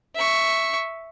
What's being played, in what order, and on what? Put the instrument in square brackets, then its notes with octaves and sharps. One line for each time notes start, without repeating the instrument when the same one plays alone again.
[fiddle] E5 C#6